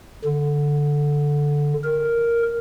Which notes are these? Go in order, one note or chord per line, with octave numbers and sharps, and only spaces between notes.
D3
A#4